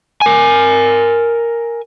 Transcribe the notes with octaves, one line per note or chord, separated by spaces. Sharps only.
A#4 G#5